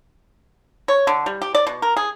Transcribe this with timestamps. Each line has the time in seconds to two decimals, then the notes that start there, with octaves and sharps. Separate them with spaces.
0.88 C#5
1.07 D3
1.26 G3
1.42 G4
1.55 D5
1.67 B2
1.82 A#4
1.97 G#4